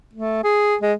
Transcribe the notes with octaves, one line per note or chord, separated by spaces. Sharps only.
A3
G#4
G#3